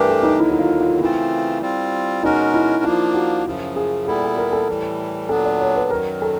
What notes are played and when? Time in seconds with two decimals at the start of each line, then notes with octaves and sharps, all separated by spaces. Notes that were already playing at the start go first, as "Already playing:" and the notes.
Already playing: G2 E3 A3 D4 G4 A#4 B4
0.09 A4
0.23 D#4
0.39 D#2 D3 F#3 E4
0.52 E4
0.59 F4
0.80 F4
1.00 C#3 E3 A3 C4 E4 F4
1.61 G3 C4 F4
2.23 B2 G#3 C#4 D#4 F#4 A#4
2.54 E4
2.84 F3 A#3 D4 F4
3.14 F#4
3.46 F#2 C#3 F3
3.76 G#4
4.06 A#2 G3 B3 E4 A4
4.23 A4
4.37 A#4
4.52 A4
4.68 A2 E3 G3
5.29 A#2 F#3 B3 D4 A4
5.45 D5
5.61 C#5
5.76 B4
5.90 F#2 D#3 F#3 A#4
6.22 A4